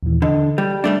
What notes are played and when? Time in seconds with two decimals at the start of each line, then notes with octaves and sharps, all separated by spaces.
0.03 D#2 A#2 E3
0.22 D3 A4 D#5
0.58 G3
0.84 G3 A3 D4